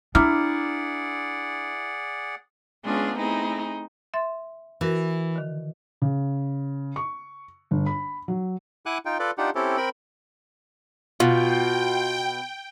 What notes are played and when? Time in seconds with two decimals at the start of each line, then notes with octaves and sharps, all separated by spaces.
0.15 D4 E4 G#4 D5 F#5 A#5 D6 F6
2.84 G#3 B3 C#4 D4 F4 G#4
3.17 A3 C4 D#4 E4 G#4
4.14 E5 C6 A6
4.81 E3 F#4 A#4
5.36 D3 D#3
6.02 C#3
6.96 C#6
7.71 G1
7.86 B5
8.28 F#3
8.86 E4 F#5 G#5 D6 F#6
9.05 D#4 F4 G5
9.19 F4 A4 B4 D5
9.38 D4 D#4 F4 G4 F#5
9.55 C4 C#4 E4 G4 A4
9.77 C4 A#4 G5 B5
11.20 B2 F4 G5